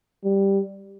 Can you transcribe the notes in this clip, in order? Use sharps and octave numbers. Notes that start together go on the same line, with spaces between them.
G3